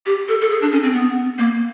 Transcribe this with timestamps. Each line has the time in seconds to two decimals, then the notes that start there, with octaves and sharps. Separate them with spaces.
0.06 G4
0.28 A4
0.41 A4
0.50 G#4
0.62 D4
0.72 C#4
0.83 C4
0.94 B3
1.38 A#3